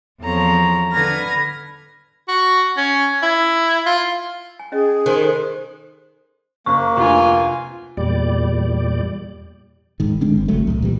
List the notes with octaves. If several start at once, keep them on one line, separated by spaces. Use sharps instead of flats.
E2 F3 C4 A4 C#5 A#5
D3 B4 B5 F6 G#6 A#6
F#4
C#4
E4
F4
G#5
C#4 G#4 D#5
G#5
D#3 C5 G#5 C6
G4 A4 C5
F#1 A#3 C#6
F1 D2 F4 G#5
E2 A#2 G3 D5
D1 G#2 D#3
D3 G#3 C4 D4
G1 C4
G#1 C#3 F#3 A3
C2 A2
A#2 E3 G3